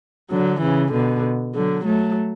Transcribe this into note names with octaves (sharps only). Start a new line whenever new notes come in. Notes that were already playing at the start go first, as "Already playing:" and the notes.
D3 F#3
C#3 E3
B2 D3
D3 F#3
F#3 A3